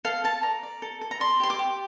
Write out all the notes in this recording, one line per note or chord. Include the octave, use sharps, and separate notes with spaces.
A4 F5
A4 A5
D5 A#5
D5
A4
A4
A#5
D5 C6
G4 C6
D6
G4